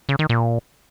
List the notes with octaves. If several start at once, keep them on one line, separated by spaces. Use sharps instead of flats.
C#3
D#3
A#2